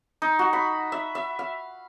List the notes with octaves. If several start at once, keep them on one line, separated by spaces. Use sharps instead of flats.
D#4
F#4
B5
E5
E5
F5